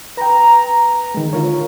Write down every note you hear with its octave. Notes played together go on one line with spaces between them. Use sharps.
B4 G5 A#5
D#3 G#3
D3 F4 A#4 C#5